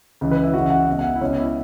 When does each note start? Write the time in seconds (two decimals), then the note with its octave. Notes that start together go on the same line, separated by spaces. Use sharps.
0.21 C#2 C#3 E3
0.31 B4
0.43 E4
0.54 C#2 C#3 E3 F#4
0.66 E5
0.70 F#5
0.88 C#2 B2 E5
0.99 F#5
1.04 E5
1.15 E4
1.21 C#2 B2 C#4
1.38 E4